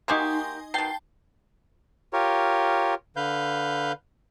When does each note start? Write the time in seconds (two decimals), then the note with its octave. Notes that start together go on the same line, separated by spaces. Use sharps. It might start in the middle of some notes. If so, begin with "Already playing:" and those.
0.08 A#3 D#4 F#4 G4 G#5 C6
0.74 B2 D#3 G5 A5 C7
2.13 F4 G4 A#4 C#5
3.16 D3 B4 F5 G6